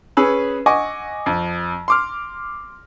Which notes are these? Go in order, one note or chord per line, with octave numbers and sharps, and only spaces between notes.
C#4 G#4 B4 E6
D#5 F#5 G#5 C#6 D6
F2
C6 D6 F6